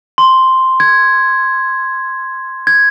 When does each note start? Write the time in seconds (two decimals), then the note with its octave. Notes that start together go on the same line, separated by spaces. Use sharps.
0.18 C6
0.80 G#6
2.67 G#6